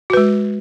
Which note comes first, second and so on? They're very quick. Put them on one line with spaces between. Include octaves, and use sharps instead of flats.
F#4 B4 G#3